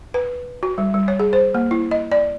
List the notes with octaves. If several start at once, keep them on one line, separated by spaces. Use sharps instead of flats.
B4
F#4
G3
G3
C#5
G#4
C5
A#3
E4
D#5
D5